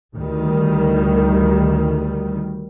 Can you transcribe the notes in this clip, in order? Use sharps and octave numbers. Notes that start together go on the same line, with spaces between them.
D2 D#3 G3